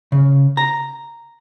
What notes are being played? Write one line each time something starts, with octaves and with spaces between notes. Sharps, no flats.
C#3
A#5